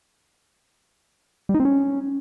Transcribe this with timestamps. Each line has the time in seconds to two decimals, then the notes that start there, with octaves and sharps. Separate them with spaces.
1.49 G3
1.54 D#4
1.60 C4
1.65 C#4